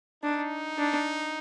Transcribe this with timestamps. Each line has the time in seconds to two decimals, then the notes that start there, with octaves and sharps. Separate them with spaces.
0.23 D4 D#4
0.78 D4